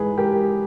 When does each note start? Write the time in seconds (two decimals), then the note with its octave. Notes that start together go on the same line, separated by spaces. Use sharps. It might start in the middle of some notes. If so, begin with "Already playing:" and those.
Already playing: G#2 E3 G#4 B4
0.18 G4 A#4